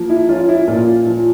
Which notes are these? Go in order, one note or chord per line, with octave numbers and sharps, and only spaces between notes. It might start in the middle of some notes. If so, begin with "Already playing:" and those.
Already playing: F3 A#3
E4
C#4 F4
E4
A#2 F4
F3